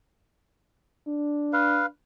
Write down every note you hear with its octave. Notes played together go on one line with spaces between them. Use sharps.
D4
B4 F5